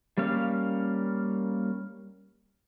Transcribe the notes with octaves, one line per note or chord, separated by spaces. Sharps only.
G3 A#3 C#4 F5